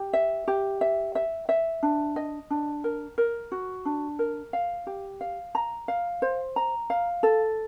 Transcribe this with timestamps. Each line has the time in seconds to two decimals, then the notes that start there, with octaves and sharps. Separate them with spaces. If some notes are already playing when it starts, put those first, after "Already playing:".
Already playing: G4
0.13 E5
0.48 G4
0.81 E5
1.15 E5
1.49 E5
1.83 D4
2.16 D#5
2.50 D4
2.84 A#4
3.18 A#4
3.52 F#4
3.85 D4
4.19 A#4
4.53 F5
4.87 G4
5.21 F5
5.55 A#5
5.88 F5
6.22 C5
6.56 A#5
6.90 F5
7.23 A4